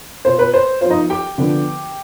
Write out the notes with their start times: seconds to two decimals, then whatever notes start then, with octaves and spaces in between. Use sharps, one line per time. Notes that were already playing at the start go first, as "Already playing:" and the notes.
0.25 B2 B3 F4 C5
0.39 B4
0.54 C5
0.81 F3 B3 F4 C5
0.90 D#4 D#5
1.10 G4 G5
1.38 D3 F3 B3 D4